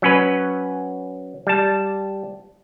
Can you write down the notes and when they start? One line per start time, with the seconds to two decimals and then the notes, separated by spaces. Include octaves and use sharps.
0.02 F#3 C#4 B4
1.47 G3 A5